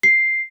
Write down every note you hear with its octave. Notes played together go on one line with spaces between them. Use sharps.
C7